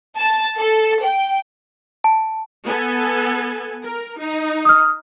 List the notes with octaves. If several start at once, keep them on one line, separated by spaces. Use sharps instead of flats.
A5
A4
G5
A5
B3 A4 G#5
A#4
D#4
D#6 F6